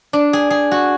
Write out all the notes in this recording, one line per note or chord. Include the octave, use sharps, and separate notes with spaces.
D4
G#4
G#4
F#4